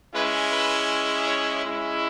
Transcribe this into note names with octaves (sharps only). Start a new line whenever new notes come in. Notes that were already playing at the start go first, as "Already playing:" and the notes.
G#3 C#4 E4 B4
B4
C#5
G#3 C#4 E4